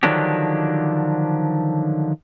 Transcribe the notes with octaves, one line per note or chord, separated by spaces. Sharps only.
D3 D#3 F3 F#3 D4 G4